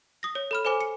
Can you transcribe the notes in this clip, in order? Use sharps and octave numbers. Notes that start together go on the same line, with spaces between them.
D#6 A#6
C#5
A4 B5 F6
A4 C5 G#5 D6
C#7